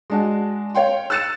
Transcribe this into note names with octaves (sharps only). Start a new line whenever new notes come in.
G#3 D4 F#4
C#5 F5 G5 C6
E6 F#6 A6 C#7 E7